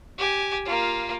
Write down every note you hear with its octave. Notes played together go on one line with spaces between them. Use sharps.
G4 G#5
A#3 F4